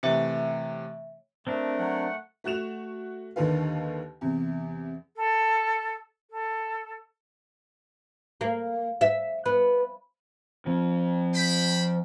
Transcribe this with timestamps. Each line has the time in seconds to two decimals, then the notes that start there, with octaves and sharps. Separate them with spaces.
0.03 C3 E3 A3 C#5 E5 C#7
1.47 A3 C4 D4 A#4
1.79 F#3 F#5
2.44 A3 F#4 F#6 E7 F7
3.36 D#2 D3 D#3 A4 B4 F5
4.21 E2 C3
5.16 A4
6.30 A4
8.41 A#3
9.01 E5
9.46 B3
10.67 F3 C4
11.35 C5 G5 B5